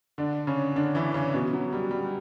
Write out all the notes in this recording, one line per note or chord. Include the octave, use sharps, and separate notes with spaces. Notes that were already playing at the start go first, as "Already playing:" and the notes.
D3 D4
C#3 C#4
D3 D4
E3 E4
C#3 C#4
B2 B3
F#3
G3
G3